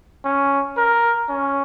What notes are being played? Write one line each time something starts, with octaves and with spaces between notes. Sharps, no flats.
C#4
A#4
C#4